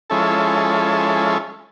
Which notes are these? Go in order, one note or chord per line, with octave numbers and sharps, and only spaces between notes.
F3 G#3 C#4 E4 A4